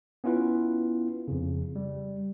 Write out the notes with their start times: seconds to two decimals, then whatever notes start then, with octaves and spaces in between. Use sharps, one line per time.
0.24 B3 C#4 E4 F4 B4
1.28 F2 C#3
1.76 G3